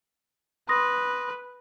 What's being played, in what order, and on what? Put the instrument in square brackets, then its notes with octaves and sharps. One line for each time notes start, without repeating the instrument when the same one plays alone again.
[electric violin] B4 [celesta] C6 D#6 A#6